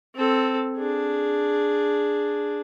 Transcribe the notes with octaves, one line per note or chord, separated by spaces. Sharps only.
C4 A4
D4 G#4